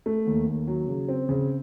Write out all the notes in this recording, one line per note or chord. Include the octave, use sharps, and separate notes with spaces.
A3
D#2
D#2
F#3
C#3
C4
C#3